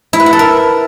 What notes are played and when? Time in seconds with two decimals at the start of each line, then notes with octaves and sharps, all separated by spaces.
0.13 E4
0.20 B4
0.26 F#5
0.33 A4
0.39 A#4